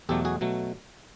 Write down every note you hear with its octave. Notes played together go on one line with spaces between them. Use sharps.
E2 B2 F#3 A3 G4 A4
F#4 G#4
B2 F#3 A3